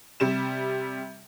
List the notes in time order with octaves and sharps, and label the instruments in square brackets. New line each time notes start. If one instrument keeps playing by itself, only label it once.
[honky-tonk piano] C3 G3 E7